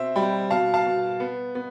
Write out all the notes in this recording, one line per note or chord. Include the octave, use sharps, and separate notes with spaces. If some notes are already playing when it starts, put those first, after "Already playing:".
Already playing: B2 C4 C5 E5
G3 G5 B5
B2 F5 A5
F5 A5
B2
B3
B3